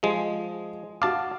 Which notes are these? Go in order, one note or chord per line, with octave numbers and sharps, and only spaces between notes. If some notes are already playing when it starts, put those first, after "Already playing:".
F3 G#3 G#4
F#4 F5 A5 D6